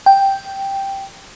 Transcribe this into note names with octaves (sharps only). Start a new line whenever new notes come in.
G5